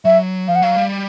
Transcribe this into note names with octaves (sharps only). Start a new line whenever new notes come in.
F#3 E5
F3 F5
F#5
F#3 F5
G3